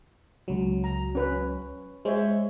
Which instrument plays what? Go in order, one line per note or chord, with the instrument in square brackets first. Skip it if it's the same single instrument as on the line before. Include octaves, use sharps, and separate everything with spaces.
[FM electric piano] C#2 F#3
[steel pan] A#5
C#4 B4
[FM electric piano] G#3 [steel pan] C5 C#5 E5